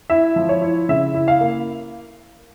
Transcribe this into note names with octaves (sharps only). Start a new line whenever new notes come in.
E4 E5
F3
C#5
E4
C#3 E5
E4
F5
A#3